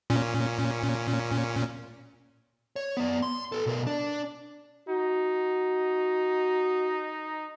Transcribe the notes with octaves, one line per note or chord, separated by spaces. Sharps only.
A#2 C#4
C#5
B3 D5
C6
A4 B4
B2 A#4
D4
D#4 F#4